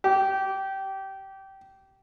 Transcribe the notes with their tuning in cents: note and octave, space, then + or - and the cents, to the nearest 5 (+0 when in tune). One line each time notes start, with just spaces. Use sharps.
G4 -20